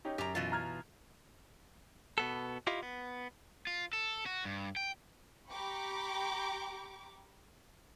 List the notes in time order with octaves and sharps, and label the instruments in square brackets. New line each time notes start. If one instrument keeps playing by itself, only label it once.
[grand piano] C#4 D#4 G4
[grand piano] F#2 [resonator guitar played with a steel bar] G4 A#5
[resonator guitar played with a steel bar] B2 E3 F4
[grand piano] A#5 F6 G#6
[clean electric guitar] B2 B3 A4
E4 F4 G4 D#5 F5
B3
[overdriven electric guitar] F4
A4
F#4
G2
G5
[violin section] G4 G5 A#5 B5 C#6 D6